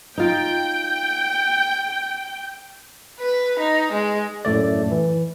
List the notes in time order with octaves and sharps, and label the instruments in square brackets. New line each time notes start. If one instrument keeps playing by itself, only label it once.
[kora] D#4 F4 [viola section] G5
[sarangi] B4
D#4
G#3
[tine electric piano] F#2 A2 A3 D5
E3